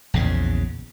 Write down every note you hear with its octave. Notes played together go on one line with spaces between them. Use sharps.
A#1 E2 C#3